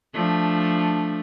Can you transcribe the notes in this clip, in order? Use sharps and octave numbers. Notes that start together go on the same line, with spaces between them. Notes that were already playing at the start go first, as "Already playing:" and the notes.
F3 A3 D4